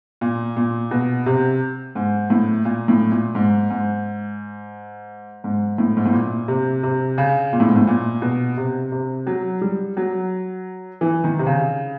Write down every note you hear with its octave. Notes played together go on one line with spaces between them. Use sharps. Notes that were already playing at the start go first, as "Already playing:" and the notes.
A#2
A#2
B2
C3
G#2
A2
A#2
A2
A#2
G#2
G#2
G#2
A2
G#2
A2
A#2
C3
C3
C#3
A#2
A2
G#2
A2
A#2
B2
C3
C3
F#3
G3
F#3
E3
D#3
C3
C#3